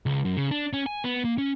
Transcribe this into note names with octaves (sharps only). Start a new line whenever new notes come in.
C#2
F#2
C#3
D4
C#4
G#5
B3
A#3
C#4